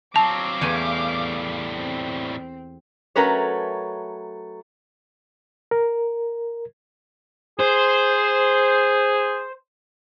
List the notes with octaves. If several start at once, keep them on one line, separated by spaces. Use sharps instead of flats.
F#3 C4 F5 A5 D6
E2 A2 G3 A3 G#5
C4
F#3 A3 C#4 A#4 B4 C#5
A#4
G#4 C5